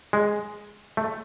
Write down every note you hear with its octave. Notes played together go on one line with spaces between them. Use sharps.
G#3
A3